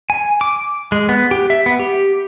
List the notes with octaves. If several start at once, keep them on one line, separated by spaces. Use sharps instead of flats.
G#5
D6
G#3
B3
G4
E5
B3
G4